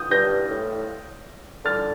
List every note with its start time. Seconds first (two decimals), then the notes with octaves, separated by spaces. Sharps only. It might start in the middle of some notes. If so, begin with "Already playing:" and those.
Already playing: D#6 G6
0.11 G2 G6 A#6
0.50 A2
1.65 D3 F6 A6